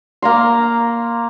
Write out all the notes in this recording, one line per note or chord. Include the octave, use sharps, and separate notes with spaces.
A#3 A#5 C6